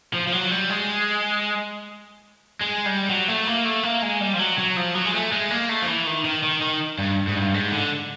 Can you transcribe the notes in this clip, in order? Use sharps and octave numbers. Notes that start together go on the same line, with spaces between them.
F3
F3
F#3
G3
G#3
G#3
G3
F#3
A3
A#3
A3
A#3
G#3
G3
F3
F#3
F#3
F3
F#3
G#3
A3
G#3
A#3
A3
F3
E3
D#3
D#3
D#3
D#3
G2
G#2
G2
G#2
D3